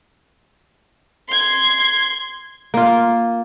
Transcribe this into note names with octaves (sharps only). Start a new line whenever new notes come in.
C6 G#6
A#3 F4